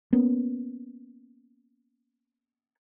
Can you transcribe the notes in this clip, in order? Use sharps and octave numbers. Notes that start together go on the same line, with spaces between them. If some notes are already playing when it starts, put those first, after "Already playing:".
A#3 B3 C#4